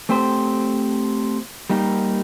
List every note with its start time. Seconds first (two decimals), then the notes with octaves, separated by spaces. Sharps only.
0.09 A3 C4 G4 C5
1.70 G3 A#3 D#4 G4 A#4